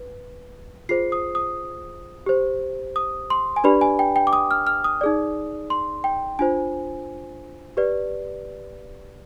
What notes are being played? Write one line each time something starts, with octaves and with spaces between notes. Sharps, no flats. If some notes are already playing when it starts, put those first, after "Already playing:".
Already playing: B4
F4 G#4 C5 C7
D#6
D#6
G4 C5
D#6
C6
G#5
D4 G4 B4 D5 B5
G#5
G5
G5
D6
D#6
F6
F6
D#6
D#4 G#4 D5
C6
G5
D4 F4 C5 G#5
G4 B4 D5